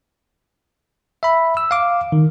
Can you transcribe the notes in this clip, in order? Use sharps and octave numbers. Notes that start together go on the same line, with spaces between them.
E5 B5
E6
F5 D6
D#3